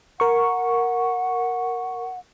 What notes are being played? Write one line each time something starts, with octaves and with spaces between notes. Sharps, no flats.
A#4 F#5 C#6